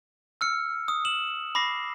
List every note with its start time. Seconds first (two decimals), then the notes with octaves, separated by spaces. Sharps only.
0.41 E6 F6 C#7
0.88 D#6
1.05 E7 F#7
1.55 B5 D6 A#6 C7